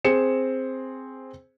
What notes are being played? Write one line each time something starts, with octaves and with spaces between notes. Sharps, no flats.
C4 G#4 C#7 E7